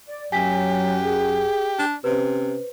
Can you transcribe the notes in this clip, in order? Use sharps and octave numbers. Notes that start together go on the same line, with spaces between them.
D5
F#2 F#3 G4 G#5 B6
G#4
D4
C3 C#4 B4 C5